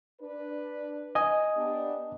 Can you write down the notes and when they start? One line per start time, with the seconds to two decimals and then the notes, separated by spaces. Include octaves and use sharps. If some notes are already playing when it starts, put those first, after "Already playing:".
0.21 D4 B4
1.15 D#5 G#5 D#6
1.56 B3 D4 G4